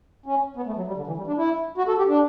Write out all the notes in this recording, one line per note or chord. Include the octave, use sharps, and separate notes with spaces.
C#4
B3
A3
F#3
G3
D3
E3
G3
D4
E4
F#4
A4
G4
D4